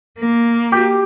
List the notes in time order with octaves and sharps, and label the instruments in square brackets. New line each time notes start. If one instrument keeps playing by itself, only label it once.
[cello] A#3
[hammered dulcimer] G4